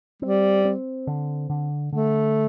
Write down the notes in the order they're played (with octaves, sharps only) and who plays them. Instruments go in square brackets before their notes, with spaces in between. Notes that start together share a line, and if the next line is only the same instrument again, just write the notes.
[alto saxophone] G3 [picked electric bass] C4
[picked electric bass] C4
D3
D3
[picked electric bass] D3 [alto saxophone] A3